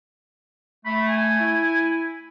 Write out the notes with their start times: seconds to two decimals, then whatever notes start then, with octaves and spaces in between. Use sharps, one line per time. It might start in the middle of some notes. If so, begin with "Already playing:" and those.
0.86 A3 B5
1.08 G#5
1.40 E4